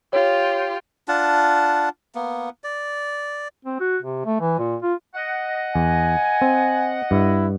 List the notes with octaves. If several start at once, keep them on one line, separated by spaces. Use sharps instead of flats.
F4 G4 C#5
D4 F4 F#5 A5
A#3 B3
D5
C4
F#4
C3
A3
E3
A#2
F4
D#5 F#5
E2 G#5
C4
G2 E4